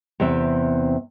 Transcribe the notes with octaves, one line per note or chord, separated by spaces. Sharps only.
E2 C3 C4 E5